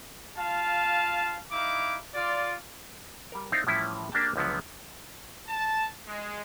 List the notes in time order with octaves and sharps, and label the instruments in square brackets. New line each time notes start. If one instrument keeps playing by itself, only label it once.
[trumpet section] F4 F5 A5
D#4 E4 F5 D6
F4 D5
[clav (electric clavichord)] G3 A#4
C4 D#4 E4 C5 D5 F5
A2 E3 F3 G3 C#4 E4
A#3 D4 G4 G#4 G5 A5
C#2 D3 F3 F#3 B3
[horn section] A5
G#3